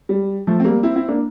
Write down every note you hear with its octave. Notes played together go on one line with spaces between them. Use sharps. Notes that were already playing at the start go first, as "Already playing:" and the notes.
G3
F3 A3
C4
G3 A#3
C4 E4
C4 E4
A#3 D4